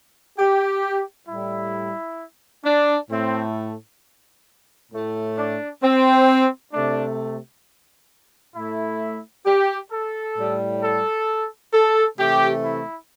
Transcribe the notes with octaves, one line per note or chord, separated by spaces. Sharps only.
G4
A2 G3 E4
D4
A2 A3 C4
A2 A3
D4
C4
C3 A3 D4
A2 A3 E4
G4
A4
A2 G3
A4
A4
C3 E3 A3 G4
E4